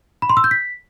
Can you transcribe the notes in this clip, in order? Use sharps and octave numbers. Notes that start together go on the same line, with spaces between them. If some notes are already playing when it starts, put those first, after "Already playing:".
B5
C6
E6
G6
B6